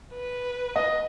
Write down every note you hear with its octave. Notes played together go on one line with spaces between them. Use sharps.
B4
D#5